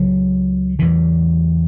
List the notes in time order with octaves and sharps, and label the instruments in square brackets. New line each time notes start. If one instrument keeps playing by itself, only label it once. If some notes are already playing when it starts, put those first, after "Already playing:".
Already playing: [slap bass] C#2 C#3 F#3
E2 C#3 E3